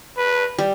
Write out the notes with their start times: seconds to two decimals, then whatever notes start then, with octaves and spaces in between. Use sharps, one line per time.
0.17 B4
0.58 G3